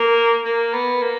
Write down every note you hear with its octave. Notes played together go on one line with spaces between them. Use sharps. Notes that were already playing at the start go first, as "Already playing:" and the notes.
Already playing: A#3
A#3
B3
A#3